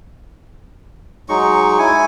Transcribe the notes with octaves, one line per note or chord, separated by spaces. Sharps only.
F#3 G#3 D#4 C#6
E4 G#5